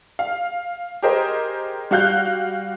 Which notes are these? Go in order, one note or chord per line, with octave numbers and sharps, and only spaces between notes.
F5
G4 G#4 A#4 C5 D#5
G3 F#4 F5 F#6 G6